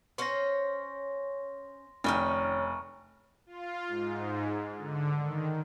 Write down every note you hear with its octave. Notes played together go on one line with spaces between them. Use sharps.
C#4 C5 C#5 C6 A#6
F1 D#3 C#4 G5 A#5 C#6 F6
F4
G#2
D3
D#3